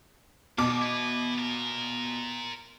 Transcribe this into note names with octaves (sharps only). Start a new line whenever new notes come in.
G#2 B2 D#3 D6
E4 B4
F4 A#4